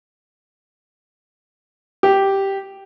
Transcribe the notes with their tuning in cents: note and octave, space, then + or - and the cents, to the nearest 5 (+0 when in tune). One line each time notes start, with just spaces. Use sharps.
G4 -5